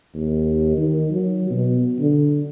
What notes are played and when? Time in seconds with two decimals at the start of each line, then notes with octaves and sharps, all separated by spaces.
0.15 D#2
0.78 D#3
1.11 F#3
1.50 B2
2.00 D3